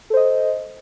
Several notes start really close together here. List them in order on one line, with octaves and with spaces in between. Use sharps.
A4 C5 D#5